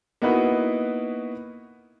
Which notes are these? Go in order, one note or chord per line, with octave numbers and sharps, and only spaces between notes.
A#3 B3 D#4 E4 F#4 B4